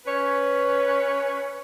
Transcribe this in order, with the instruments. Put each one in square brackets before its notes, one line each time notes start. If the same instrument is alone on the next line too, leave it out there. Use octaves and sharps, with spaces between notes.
[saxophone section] C#4 B4 C#5